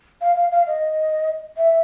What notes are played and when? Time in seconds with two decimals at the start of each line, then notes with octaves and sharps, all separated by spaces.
0.21 F5
0.36 F5
0.52 F5
0.67 D#5
1.57 E5